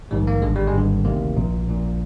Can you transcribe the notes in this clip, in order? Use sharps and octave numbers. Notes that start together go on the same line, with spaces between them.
A#1 G#2 D#3 G3
A#3
G#1 G2 D3 G#3
G3
G#3
G#1 G2 D3
D2 C3 D#3 A#3
A#1 A#2
A#1 A#2